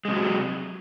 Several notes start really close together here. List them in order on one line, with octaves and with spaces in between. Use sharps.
G#3 C3 F#3